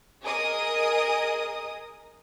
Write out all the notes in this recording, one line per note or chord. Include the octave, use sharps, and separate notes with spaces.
G#4 A#4 D#5 D#6